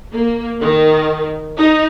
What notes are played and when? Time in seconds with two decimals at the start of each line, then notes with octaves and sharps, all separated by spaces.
0.12 A#3
0.61 D#3
1.58 D#4